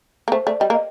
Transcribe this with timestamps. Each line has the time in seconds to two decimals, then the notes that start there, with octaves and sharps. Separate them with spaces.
0.28 A#3
0.32 A3 C5
0.47 A3 D5
0.60 G3 D#5
0.70 A#3
0.74 D#5